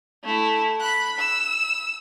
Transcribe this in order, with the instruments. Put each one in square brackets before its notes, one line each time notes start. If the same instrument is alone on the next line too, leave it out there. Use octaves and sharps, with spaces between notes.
[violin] A3 E4
B5 F#6
E6